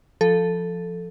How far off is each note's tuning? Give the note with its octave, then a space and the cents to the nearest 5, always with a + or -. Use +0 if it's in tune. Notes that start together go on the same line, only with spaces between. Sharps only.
F3 +0 A4 +0